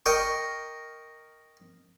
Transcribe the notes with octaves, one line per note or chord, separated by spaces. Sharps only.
A#4 D#5 G5 C#6